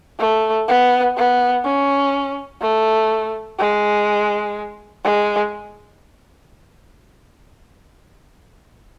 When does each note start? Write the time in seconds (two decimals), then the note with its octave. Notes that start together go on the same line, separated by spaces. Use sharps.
0.19 A3
0.68 B3
1.17 B3
1.65 C#4
2.61 A3
3.58 G#3
5.04 G#3